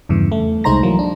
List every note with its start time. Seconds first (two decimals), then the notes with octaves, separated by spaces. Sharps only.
0.09 E2 G2 C#3 E3
0.32 A3
0.64 C2 G#3 D#4 C5 A#5 A#6
0.83 E3 F#3 A#3
0.99 D4